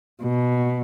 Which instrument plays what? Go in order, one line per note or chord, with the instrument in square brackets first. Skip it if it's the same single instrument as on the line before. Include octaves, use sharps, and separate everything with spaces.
[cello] B2